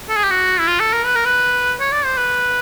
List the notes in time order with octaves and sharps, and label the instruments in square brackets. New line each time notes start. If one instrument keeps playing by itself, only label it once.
[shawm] A4
G#4
G4
F#4
E4
F4
A4
A#4
B4
A#4
B4
C#5
D5
C5
B4